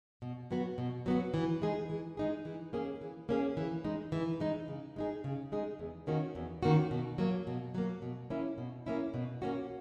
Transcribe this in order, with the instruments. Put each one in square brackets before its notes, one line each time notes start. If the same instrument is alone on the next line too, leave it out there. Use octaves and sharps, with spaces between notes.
[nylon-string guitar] B2
F#3 B3 F#4
B2
F#3 B3 F#4
E3
G#3 D#4 G#4
E3
G#3 D#4 G#4
E3
A#3 C#4 G#4
E3
A#3 C#4 G#4
E3
G#3 D#4
E3
G#3 D#4
C#3
G#3 D#4 G#4
C#3
G#3 D#4 G#4
E2
D#3 A#3 C#4 F#4
E2
D#3 A#3 C#4 F#4
B2
F#3 A#3
B2
F#3 A#3
B2
A#3 C#4 E4
B2
A#3 C#4 E4
B2
A#3 C#4 F#4